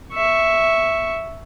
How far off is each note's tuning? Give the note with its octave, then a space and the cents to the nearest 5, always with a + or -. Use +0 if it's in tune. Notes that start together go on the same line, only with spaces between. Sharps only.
E5 +0 C#6 +0